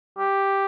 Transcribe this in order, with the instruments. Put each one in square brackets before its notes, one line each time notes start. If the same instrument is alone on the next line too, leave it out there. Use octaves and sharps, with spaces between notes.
[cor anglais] G4